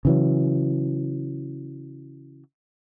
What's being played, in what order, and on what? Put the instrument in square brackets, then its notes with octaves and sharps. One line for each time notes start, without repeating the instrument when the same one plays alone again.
[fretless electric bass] C#3 E3 F#3